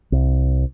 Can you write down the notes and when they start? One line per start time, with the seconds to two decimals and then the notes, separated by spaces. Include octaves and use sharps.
0.12 C2